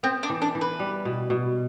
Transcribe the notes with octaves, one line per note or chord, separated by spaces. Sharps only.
B3 C4
D4
E3
D4
E3
B4
G3
B2
B2